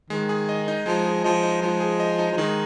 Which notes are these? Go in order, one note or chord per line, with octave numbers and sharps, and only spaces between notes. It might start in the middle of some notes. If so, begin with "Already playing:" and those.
D#3 G#3
G#4
D#5
D#4
F3 G#3
G#4
F3 D#5
D#4
F3 G#3
G#4
D#5
D#4
F3
D#3 G#3